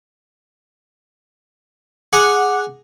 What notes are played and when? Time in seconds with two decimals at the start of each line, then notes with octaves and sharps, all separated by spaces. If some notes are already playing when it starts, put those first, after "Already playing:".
2.13 G#4 F#5 G#5 A#5 D6